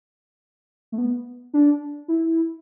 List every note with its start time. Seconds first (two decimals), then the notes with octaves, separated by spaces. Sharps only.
0.92 A3
0.98 B3
1.53 D4
2.08 E4